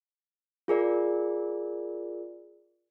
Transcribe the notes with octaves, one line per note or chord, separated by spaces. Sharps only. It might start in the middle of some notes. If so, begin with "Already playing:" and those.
F4 G#4 A#4 D5